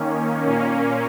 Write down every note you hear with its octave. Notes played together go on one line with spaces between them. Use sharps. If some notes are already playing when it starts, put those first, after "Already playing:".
Already playing: D#3 A#3 C#4
A#2 A#3 C#4